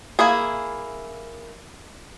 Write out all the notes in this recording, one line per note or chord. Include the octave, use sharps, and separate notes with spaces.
A#3 E4 G#4